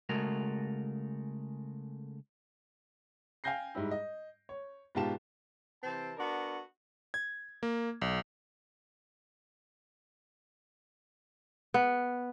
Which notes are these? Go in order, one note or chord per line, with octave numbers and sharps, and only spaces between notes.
C#3 G#3 A3 F#4 A#4
F5 G5 G#5 G6 A#6 C7
G#2 G3 E4
D#5
C#5
G#2 B2 F4 G4 A5 E7
C3 E3 C4 A5
B3 D4 F#4 A#4
G#6
A#3
B1
B3